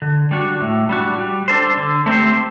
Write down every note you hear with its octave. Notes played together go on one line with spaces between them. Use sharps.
D3
G3 D4 F#4
A2
G3 D4 F#4
G3
D4 A4 C5
D3
A3 C4 G4 C5